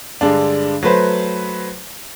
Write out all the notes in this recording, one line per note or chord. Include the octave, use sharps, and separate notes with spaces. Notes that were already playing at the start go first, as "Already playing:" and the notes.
G2 D3 G#3 D4
F#3 A3 B4 C5